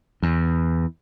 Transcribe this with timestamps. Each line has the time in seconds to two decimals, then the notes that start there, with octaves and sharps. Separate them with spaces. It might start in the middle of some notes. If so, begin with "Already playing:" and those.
0.23 E2